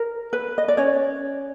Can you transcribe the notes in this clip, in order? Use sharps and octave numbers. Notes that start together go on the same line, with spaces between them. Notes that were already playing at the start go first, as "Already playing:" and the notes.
Already playing: A#4
B4
D#5
D5
C#4 C#5